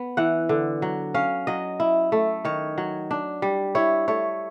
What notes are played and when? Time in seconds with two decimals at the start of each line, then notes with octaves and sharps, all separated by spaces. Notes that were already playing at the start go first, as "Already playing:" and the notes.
Already playing: B3
0.17 E3 F#5
0.49 D3
0.82 F#3
1.14 C#4 F5
1.47 F#3 D#5
1.80 E4
2.12 A3
2.45 D#3 C#5
2.78 F#3
3.11 D4
3.42 G3
3.75 E4 C#5
4.08 A3 C#5